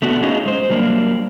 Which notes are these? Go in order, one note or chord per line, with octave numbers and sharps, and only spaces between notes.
A3 B3 D4 F#4
C#4 D#4 F4 G#4 D#5
G#3 C5
F#3 G3 A#3 D4